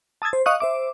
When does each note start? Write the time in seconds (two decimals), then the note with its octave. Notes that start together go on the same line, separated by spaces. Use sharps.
0.22 A5 D#6 E6 G#6 A6
0.33 C5
0.46 D#5 F5 C#6 D#6 F#6
0.60 C5 E5 D6